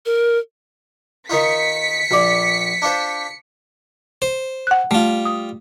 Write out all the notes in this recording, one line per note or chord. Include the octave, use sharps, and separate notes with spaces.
A#4
D#3 D#4 F4 B6 C#7
A#1 D5
D4 F4 C5
C5
F#5 F#6
G3 A3 F4
D#6